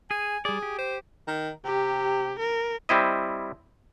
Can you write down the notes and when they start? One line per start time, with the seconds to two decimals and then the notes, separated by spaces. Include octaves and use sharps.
0.11 G#4 G#5
0.45 G3 G#4 D5
0.63 G4
0.79 C5
1.28 D#3
1.65 C3 G4
2.39 A#4
2.89 G3 C4 E4 D#5